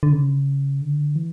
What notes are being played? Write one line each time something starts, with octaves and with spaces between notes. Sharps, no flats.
D3
C#3
D3
E3